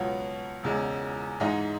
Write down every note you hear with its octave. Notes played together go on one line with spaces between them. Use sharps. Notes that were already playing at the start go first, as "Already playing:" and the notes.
Already playing: C#2 B2 F#3 B3
E1 E2 C#3 G#3
G#2 E3 G#3 D#4